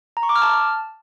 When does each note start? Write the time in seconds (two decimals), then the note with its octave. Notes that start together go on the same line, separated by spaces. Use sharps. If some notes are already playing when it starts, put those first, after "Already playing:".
0.17 A#5
0.23 C#6
0.29 D6
0.36 F6
0.42 A5